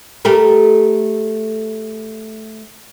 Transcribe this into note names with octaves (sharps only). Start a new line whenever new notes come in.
A3 G4 A#4